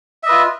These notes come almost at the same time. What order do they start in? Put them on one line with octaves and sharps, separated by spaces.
E5 D#5 B4 F4